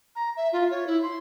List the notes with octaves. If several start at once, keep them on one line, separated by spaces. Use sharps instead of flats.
A#5
E5
F4
C#5
E4
C6